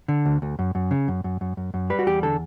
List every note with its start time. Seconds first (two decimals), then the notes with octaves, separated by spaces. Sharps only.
0.08 D3
0.26 D2
0.42 D2
0.59 F#2
0.75 F#2
0.91 C#3
1.08 F#2
1.24 F#2
1.41 F#2
1.57 F#2
1.74 F#2
1.90 G3 B4
1.99 F#4
2.07 E2 G4
2.23 D3 A4